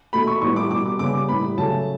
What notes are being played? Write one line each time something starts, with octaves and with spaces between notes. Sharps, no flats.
B2 A3 B5
C#6
A2 G3 B3 C#6
D6
B2 G3 B3 D6
D6
C#3 G3 B3 D6
D6
A2 G3 B3 B5
C#3 F#3 A3 A5